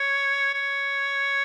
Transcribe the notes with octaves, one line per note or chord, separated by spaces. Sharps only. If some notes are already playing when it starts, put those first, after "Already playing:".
Already playing: C#5
C#5